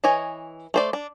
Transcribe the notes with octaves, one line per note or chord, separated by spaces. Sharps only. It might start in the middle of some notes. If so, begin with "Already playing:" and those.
E3 C#5 D#5 G#5
A3 C5 D5
D4